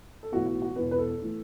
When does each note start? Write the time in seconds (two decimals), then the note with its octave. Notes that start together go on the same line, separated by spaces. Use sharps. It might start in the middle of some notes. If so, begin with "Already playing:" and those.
0.23 A4
0.32 B1 A2 E3 B3 F#4
0.46 F#4
0.62 F#4
0.76 E1 E2 E3 B3 B4
0.91 B4
0.98 A4
1.21 A2 E3 A3